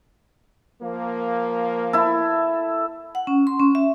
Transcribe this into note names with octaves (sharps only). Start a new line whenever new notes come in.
F3 A#3
E4 A4
F#5
C#4
C6
C#4
E5